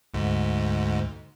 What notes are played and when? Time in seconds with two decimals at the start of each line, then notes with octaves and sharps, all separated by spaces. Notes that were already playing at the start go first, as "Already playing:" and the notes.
0.14 D2 G#2